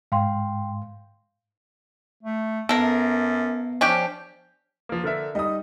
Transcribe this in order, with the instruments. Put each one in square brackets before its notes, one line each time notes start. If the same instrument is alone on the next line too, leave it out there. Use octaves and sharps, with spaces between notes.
[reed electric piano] G#2 [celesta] F5 G5 C6
[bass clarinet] A3
[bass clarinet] F#2 [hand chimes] B3 E5 C7 [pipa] A4 A#4
[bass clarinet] F3 [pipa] C#4 D4 G4
[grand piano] F3 A#3
D3 A#4 E5
[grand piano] G3 D#4 [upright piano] D#5 D#6